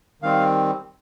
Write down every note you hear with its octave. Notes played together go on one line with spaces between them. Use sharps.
D#3 G3 C4 F5